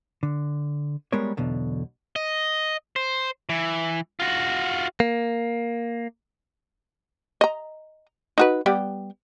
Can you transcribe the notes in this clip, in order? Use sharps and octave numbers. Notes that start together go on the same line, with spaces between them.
D3
G3 G#3 B3 A#4 C#5
B1 E2 B2 D3
D#5
C5
E3
F4 F#4
A#3
D#5 A#5
D#4 F#4 B4
G3 B3 G4